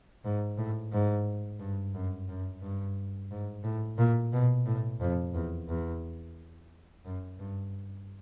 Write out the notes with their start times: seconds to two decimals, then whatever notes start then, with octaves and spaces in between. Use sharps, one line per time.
0.24 G#2
0.57 A2
0.92 G#2
1.59 G2
1.95 F#2
2.29 F#2
2.62 G2
3.31 G#2
3.64 A2
3.98 A#2
4.32 B2
4.66 A2
5.00 F2
5.34 E2
5.68 E2
7.05 F#2
7.39 G2